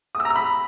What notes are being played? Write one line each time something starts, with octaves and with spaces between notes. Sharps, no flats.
D#6
E6
A#5
E6
B5